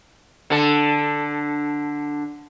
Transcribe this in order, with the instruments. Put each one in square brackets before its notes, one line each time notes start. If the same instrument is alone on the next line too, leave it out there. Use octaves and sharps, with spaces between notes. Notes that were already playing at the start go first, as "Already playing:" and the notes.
[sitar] D3 A4